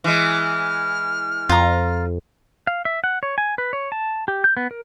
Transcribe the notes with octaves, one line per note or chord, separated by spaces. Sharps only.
E3 G#3 F6
F2 F4 A#5
F5
E5
F#5
C#5
G#5
B4
C#5
A5
G4
G6
B3
A#4